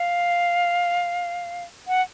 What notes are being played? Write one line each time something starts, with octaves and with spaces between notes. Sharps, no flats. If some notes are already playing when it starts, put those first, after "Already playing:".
Already playing: F5
F#5